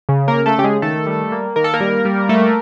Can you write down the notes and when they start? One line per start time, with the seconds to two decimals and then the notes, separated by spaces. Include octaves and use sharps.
0.09 C#3
0.28 A#3 A#4
0.34 C#3
0.46 A3 A4
0.58 C#3 G4
0.64 G#3 G#4
0.82 D#3 A3 A4
1.07 G3
1.32 A#3
1.56 D#3 A#4
1.64 A4
1.74 A#3 A#4
1.80 G3
2.05 G3
2.29 A3